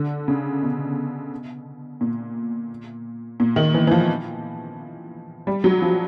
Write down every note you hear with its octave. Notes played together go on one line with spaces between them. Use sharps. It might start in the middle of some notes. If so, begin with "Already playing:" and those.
Already playing: D3
C#3
B2
A#2
A#2
D#3
E3
E3
F3
G3
F#3
F3